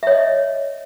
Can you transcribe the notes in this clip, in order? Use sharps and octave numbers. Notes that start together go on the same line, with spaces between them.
C#5 D#5 E5